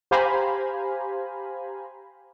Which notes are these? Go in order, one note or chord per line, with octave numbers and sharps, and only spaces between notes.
G4 C5 F5 G#5 A#5 B5